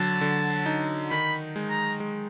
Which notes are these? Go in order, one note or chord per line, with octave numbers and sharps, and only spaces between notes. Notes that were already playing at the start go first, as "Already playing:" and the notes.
Already playing: D3 F#3 A5
D3
D#4
D#3 B5
G#3
A#5
G#3